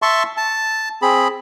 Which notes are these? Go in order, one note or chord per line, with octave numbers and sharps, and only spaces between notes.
E5 A5 C6 C#6
A5
C4 G#4 B5